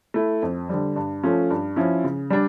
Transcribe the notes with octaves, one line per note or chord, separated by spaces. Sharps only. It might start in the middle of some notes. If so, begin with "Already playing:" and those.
A3 E4
F2
D3 G3
G2
F3 A3 C#4 F4
G2
F3 C#4 E4
C#3
G3 D4